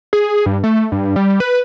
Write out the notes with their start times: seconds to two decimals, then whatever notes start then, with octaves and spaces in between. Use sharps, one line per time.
0.13 G#4
0.46 G2
0.64 A3
0.92 G2
1.16 G3
1.40 B4